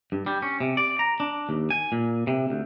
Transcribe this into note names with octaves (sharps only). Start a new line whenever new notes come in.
G2
G3
C#4
C3
D5
A#5
D4
D#2
G#5
A#2
C3
D2